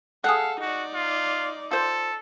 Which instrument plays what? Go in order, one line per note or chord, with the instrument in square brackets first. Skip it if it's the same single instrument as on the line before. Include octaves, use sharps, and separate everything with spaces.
[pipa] G#4 F#5 [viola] A4 [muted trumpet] F5
[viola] D#4 D5 [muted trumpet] F#4
[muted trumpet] F4
[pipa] F4 C5 [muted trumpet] A4